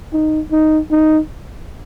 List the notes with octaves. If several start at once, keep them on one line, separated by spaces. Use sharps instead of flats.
D#4
D#4
D#4